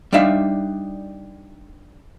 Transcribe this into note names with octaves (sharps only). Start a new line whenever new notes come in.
G3 D4 D#4 E5 F5